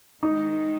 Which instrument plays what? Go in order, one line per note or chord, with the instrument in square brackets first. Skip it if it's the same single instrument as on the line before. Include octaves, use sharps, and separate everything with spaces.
[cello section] D#3 G#3 [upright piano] D#4